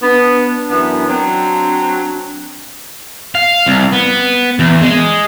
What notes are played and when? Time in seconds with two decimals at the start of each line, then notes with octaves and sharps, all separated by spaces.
0.02 B3 D4
0.71 F#2 E3 B3
1.09 F#3 C4
3.35 F5
3.68 C2
3.93 B3
4.59 E2
4.81 G#3